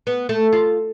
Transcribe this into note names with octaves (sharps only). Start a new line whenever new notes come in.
B3
A3
F4